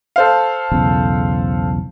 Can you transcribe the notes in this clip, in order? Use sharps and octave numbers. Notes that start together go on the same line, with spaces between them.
A4 C5 F5
B1 E2 C#3